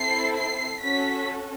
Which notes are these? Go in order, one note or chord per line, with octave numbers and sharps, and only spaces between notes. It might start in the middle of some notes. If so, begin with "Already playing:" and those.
Already playing: C4 E4 A4 C7
C7
C#4 F#4 A4 B6